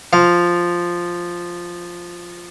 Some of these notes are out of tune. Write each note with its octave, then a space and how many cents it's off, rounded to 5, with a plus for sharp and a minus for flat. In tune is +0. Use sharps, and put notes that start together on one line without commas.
F3 +0 F5 +0